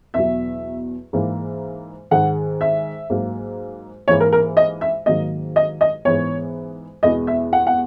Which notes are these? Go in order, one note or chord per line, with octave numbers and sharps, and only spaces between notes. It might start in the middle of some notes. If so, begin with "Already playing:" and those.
E2 B2 F#3 E5
G#2 E3 A#3
G#2 D#3 G#3 F#5
E5
G#2 F#3 A#3
G#2 E3 A#3 C#5
A#4
A#4
D#5
E5
G#2 D#3 F#3 A#3 D#5
D#5
D#5
G#2 E3 B3 C#5
E2 B2 G#3 B3 D#5
E5
F#5
F#5